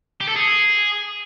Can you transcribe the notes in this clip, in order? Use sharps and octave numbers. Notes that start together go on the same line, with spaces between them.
G4
A4
G#4